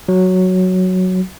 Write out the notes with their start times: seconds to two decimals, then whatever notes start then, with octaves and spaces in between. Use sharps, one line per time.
0.09 F#3